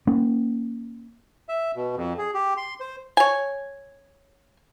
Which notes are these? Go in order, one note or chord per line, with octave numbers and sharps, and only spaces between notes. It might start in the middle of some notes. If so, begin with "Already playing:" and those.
A#3 C#4
E5
B2
F2
G#4
G4
C6
C5
C#5 G#5